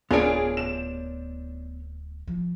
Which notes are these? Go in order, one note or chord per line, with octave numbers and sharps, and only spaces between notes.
D1 B3 D4 F4 G#4 A#4 C#5 D7
E7
F3